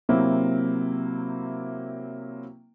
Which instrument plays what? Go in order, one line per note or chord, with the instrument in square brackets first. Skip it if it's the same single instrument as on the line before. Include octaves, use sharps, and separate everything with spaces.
[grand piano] C3 F#3 A#3 C4 E4